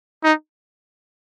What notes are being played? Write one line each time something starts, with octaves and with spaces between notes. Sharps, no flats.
D#4